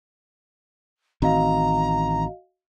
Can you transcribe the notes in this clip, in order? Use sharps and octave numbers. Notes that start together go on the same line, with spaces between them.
A1 D#3 C4 F#4 D#5 F5 A#5